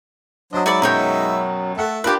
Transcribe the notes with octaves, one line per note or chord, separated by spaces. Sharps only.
F#3 D4 C5 D#5 D#6
G#3 D#4 C#5 D5 E5 B5
F#2 B2 A#4 C#5 G5 B5
A3 A4 E5 F#5
D4 F4 G4 A#4 B4